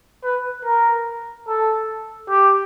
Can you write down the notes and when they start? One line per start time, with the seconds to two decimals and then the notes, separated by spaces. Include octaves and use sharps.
0.24 B4
0.65 A#4
1.47 A4
2.29 G4